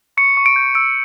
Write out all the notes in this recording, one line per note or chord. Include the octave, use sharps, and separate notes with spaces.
C#6 C#7
C#6
D7
G6
E6 D7